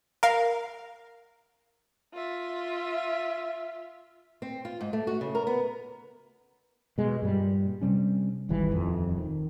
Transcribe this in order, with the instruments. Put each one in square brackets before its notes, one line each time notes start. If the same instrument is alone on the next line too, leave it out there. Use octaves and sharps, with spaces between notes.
[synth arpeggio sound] A#4 F5
[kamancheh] F4 E5
[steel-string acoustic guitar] C4
F4
G#2
A3
F#4
C#3
A#4
B3
[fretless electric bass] B2 G#3
G2 A#2 G3
C3 G3 C#4
D#1 G#1 E3 G3
D#1 F2
D#3